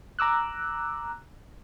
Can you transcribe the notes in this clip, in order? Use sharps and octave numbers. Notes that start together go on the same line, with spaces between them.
A#5 D6 E6 F#6